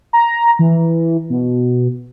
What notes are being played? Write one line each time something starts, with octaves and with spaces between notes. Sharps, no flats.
A#5
E3
B2